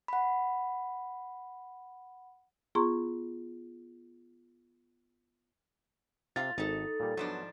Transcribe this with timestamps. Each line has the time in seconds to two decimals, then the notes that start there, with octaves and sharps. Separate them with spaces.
0.08 F#5 B5
2.75 B3 F4 G#4 A#5 C6 C#6
6.36 C3 F4 F5 A6
6.58 G#1 D#4 A4
7.00 A#2 G3
7.17 G#2 F3 F#3 B3 D4